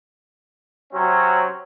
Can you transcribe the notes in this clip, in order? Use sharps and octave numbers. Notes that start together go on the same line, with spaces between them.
C3 F#3 C4 C#4